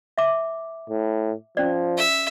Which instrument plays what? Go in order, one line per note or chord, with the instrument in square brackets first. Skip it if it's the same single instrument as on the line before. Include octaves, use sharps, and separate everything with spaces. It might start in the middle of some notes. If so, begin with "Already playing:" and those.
[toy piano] E5 D6
[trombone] A2
[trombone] F3 [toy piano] C#4 D5
[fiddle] E5